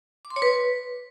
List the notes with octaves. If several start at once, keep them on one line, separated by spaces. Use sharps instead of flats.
D6
C6
C#5
B4